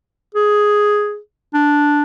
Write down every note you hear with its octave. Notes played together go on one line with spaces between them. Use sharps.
G#4
D4